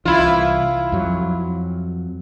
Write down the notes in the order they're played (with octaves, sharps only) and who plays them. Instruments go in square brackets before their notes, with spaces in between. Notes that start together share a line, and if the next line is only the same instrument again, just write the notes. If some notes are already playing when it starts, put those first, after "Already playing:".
[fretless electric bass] C2 E3 [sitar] E4 F4
[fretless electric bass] F2 F#3